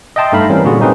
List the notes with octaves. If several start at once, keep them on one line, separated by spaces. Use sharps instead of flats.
D#5 E5 G5 A5 C6
G2 A3 D#4 F5 B5
E3 G3 C4 C#4 A#4
A#2 D3 F4 F#4 G#4
F#3 A#3 C4 D#4 G#4 B4